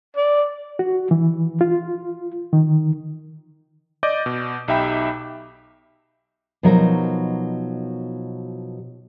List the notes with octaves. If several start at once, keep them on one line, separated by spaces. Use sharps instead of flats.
D5
F#4
E3
F4
D#3
D5 D#5 D6 G6
B2
B1 D#4 G4 E5 G5 B5
B2 F3 F#3 D#4 A#4